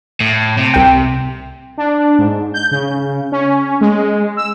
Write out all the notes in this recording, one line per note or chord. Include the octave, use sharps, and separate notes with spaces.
A2
C3
C2 G5
D4
G#2
G6
C#3
C#4
G#3
E6